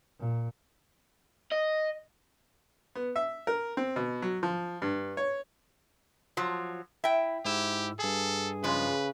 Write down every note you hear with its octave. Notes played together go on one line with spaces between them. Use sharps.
A#2
D#5
B3
E5
A#4
C4
B2
F#3
F3
G2
C#5
F3 F#3
E4 E5 G5
G#2 E4 G4 E6
G2 G#4 A4
C#3 F3 G#3 B4